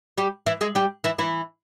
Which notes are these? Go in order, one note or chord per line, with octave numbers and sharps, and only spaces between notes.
G3 G4
E3 E4
G#3 G#4
G3 G4
E3 E4
E3 E4